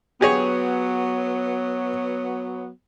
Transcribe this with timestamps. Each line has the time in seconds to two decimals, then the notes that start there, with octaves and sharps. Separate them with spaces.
0.21 F#3 B3 G4 G#4 C#5